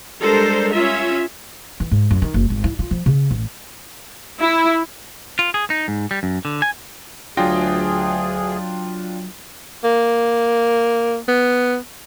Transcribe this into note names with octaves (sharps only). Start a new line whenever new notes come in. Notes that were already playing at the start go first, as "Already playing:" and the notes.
G3 G#3 D4 A4 A#4 C5
C#4 F4 E5
E3
G#2
F#2
D#3
F#1
G#1
E4
F4
F3
C#3
A1
E4
F4
G#4
D#4
G#2
G3
F#2
D3
G#5
D2 F#3 D4 F4 G#4 G5 A#6
A#3
B3